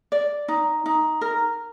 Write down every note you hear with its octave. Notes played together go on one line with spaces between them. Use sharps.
D5
D#4
D#4
A#4